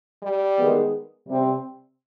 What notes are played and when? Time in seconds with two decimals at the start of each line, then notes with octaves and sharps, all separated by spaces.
0.23 G3
0.57 D#3 G#3 B3
1.26 C3 G3 C4